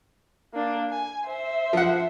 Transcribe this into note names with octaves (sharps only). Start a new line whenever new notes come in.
A#3 D4
G#5
C5 E5
F3 F#5